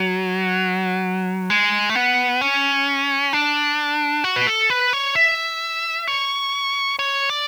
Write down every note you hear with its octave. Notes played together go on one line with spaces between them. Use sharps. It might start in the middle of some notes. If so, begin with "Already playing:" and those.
Already playing: F#3
G#3
A3
B3
C#4
D4
F#4
B4
A4
B4
C#5
E5
C#5
C#5
D5